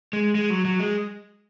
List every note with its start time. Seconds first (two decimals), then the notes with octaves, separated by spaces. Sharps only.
0.13 G#3
0.35 G#3
0.50 F#3
0.65 F#3
0.80 G#3